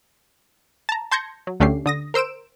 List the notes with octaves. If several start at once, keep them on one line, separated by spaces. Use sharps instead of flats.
A5 A#5
A5 C6 G6 G#6 A#6 C#7
F#3
D2 D3 A3 C#4 G4 C7
D3 D#6 A#6
A#4 C5 E6 D7 E7